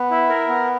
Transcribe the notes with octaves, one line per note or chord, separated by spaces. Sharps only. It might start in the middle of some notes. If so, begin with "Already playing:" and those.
Already playing: B3
E4
A#4
B3